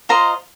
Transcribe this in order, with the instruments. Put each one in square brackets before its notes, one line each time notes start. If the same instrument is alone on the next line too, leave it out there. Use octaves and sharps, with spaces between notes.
[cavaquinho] F4 C5 D#5 A#5